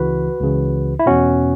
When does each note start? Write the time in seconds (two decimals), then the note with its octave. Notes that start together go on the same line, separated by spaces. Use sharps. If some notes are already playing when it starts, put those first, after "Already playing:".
Already playing: C#2 C#3 E3 F#4 B4
0.40 C#2 C#3 E3
0.99 E4
1.06 E2 B2 C#4 F#4